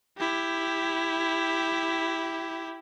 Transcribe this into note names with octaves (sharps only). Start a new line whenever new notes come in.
E4 G4